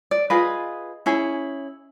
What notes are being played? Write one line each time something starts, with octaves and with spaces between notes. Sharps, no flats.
D5
F4 G#4 B4 D#5
C#4 E4 G#4